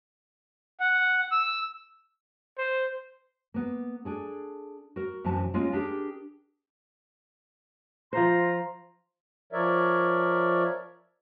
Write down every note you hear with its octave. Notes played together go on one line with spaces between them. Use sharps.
F#5
E6
C5
A#3 B3
D4 G#4 A4
F#4 A#4
F#2 C3 E3 F#4 A5
G#3 A#3 C#4 F4
D4 G4 G#4 A#4
F3 F4 C5 A#5 C6
F3 A#4 C#5 D5 E5